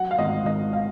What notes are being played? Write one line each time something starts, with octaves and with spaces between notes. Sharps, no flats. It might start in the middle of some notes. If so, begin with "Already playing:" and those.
Already playing: F#3 F#5
F5
G#1 D#5
G#1 D#5
F5